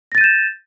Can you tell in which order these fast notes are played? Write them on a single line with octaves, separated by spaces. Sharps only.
A#6 A6 D#7 G6 E7